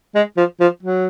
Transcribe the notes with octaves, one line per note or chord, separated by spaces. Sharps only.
G#3
F3
F3
F#3